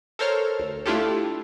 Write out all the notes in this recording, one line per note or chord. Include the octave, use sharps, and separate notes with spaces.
A4 A#4 C5 C#5 F6
D2
A3 D4 E4 F4 G4 A4